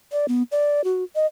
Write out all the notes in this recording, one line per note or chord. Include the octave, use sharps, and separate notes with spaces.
D5
B3
D5
F#4
D#5